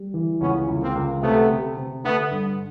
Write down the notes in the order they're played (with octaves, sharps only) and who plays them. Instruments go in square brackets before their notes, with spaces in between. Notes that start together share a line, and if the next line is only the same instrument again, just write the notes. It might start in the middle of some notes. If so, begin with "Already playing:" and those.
Already playing: [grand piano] G3
E3
[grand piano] C#2 [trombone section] B3 C#4
[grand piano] C#2
[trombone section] A#3 C4
[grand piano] C#2
[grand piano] C3 [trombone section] A3 B3
[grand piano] C3
C3
[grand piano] D3 [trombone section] A3 B3
[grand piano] G2